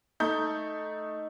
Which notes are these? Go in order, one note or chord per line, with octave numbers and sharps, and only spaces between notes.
A3 D#4 G6